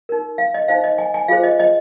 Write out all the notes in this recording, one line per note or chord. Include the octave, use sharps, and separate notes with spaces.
D#4 A#4
F5
D#5
D#4 C5 F5
D#5
G#5
G#5
F4 G#4 C5 F5
D#5
D#5